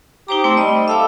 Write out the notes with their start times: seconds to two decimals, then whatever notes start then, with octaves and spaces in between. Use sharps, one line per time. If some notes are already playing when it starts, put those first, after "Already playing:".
0.28 D#4 G4 C5 A#5
0.44 A3 C4 D#4 C5
0.57 G3 D#5
0.88 A4 E5 F5 D6